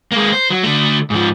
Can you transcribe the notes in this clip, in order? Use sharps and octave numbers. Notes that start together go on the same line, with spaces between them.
G#3 A#3
C5
F#3
D3 A3
G#2 F3